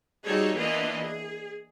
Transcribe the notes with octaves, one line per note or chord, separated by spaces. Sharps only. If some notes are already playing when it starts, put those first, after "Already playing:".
G3 D#4 F#4 G#4 A4 C#5
E3 A#3 B3 D4 F4 D#5
G#4